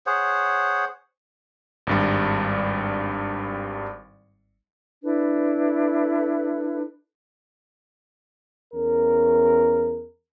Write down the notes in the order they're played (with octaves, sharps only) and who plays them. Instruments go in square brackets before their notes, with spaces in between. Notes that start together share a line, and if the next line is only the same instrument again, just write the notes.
[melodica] G#4 C5 C#5 F#5
[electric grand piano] G#1 G2 G3
[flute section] D4 E4 A4 B4
[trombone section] E2 C#4 A#4